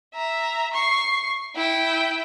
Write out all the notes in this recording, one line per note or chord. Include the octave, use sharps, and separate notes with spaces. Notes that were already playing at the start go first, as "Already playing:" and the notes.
E5 A#5
C#6 C7
E4 G5